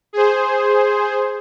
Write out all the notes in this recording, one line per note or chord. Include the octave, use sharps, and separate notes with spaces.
G#4 C5